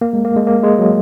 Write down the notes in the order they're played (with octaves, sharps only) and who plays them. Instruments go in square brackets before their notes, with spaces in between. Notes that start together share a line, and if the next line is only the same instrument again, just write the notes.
[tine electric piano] A#3
G#3
A#3
G#3
A#3
G#3
F#3